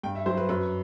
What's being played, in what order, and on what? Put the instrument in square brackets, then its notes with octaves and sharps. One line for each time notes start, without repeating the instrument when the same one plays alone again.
[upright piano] G2 G5
E5
F#3 C5
B4
F#2 B4